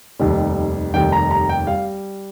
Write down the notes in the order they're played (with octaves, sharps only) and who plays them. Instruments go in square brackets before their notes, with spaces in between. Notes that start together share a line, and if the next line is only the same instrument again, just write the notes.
[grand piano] F1 D#2 D#3 G3
F1 D#2 D#3 G3 G5
A#5
A#5
G5
G3 F5